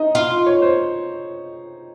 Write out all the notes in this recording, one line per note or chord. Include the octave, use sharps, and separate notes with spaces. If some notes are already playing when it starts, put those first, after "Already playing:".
Already playing: D#4 D#5
F4
C#5
C5